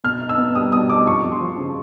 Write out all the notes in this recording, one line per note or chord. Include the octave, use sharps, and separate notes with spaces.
B2 F6
D#4
E6
B3
G3 D#6
B2 D#6
D#4 D6
F2 C#6
F2
C6
F3
C#3